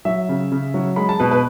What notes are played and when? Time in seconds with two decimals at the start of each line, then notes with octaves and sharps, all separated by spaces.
0.05 F#3 E5
0.29 C#3
0.52 C#3
0.74 F#3
0.96 G#3 B5
1.09 A5
1.20 B2 B4
1.31 B4